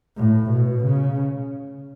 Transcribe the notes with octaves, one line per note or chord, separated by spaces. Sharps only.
A2
B2
C#3